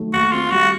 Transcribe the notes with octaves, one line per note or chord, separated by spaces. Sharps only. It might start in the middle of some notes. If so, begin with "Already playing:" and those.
Already playing: D#3 F#3 A3
D#2 F#4
C4 F4
G3 F#4